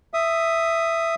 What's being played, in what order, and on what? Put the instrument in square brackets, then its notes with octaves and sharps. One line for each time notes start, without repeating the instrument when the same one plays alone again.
[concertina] E5 D#6